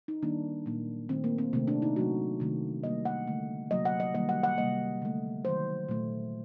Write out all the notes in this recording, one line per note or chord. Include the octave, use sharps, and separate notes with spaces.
D#4
D#3 G3 A#3 D4
A#2 F#3 A#3
D#3 A3 C4
A#3
C4
C3 D#3 A3 C4
D4
D#4
C3 F#3 A3 F#4
C3 D#3 A3
C3 G3 A#3 D#5
F#5
D3 A3
C3 F#3 A#3 D#5
F#5
D#5
D#3 G3 A#3 D#5
F#5
F#5
C3 G3 A#3 D#5
D3 A3
D#3 F#3 A3 C5
A#2 F#3 A3